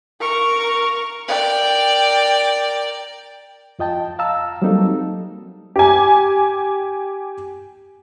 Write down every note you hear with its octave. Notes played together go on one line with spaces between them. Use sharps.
A#4 C#6
A#4 D5 G5
F2 F4 D#5 G5 A5
F5 A5 A#5 E6
F#3 G3 A#3 C4 D#4 A4
G4 G#5